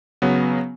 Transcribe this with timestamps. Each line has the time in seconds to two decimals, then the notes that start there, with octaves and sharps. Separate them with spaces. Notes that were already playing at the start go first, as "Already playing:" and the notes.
0.22 C#3 F#3 B3